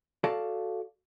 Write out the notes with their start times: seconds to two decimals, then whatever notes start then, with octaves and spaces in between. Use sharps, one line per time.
0.24 F#4 A4 D5 F5 A5